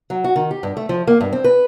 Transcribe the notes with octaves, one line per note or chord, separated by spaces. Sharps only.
F#3
F#4
D#3
G4
G2
A3
F3
A#3
G2
C4
B4